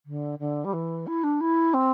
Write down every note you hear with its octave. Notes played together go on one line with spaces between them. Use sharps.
D3
D3
G3
E3
E4
D4
E4
C4